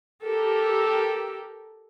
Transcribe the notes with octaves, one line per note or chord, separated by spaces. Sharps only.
G4 A4 A#4